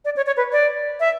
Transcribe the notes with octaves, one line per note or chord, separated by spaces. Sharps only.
D5
C#5
C#5
B4
D5
E5